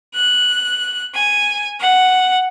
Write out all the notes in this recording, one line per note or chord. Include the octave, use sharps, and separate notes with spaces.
F#6
G#5
F#5